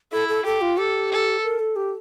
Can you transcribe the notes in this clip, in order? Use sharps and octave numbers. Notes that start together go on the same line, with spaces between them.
E4 A4
A4
G4 A4
F4
G4 A4
A4
A#4
A4
G4